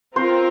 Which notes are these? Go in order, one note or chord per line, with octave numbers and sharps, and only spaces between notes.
C4 F4 A#4 C5